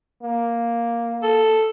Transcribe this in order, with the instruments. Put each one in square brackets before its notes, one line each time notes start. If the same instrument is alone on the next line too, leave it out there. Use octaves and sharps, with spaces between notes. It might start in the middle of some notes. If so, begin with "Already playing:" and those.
[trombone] A#3
[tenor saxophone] A4